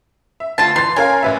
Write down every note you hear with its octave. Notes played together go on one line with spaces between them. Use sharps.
E5
D2 F4 A5
E3 C6 A6
C#4 A#4 F5 G#5
A1 B4 E5